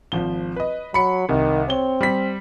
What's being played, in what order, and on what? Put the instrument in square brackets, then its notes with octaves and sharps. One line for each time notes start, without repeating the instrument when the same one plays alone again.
[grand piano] G#1 F3 G7
B4 D#5
[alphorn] F#3 [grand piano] B5 C#7
[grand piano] C2 [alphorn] D#3
[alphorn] C4 [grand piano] C#5 G7
[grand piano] G3 B6